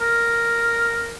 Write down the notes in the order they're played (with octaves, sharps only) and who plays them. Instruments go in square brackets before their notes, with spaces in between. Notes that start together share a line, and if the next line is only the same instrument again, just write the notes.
[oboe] A#4